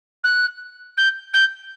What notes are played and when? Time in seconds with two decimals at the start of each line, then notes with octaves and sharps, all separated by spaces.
0.24 F#6
0.97 G6
1.33 G6